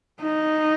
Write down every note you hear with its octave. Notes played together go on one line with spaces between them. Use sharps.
D#4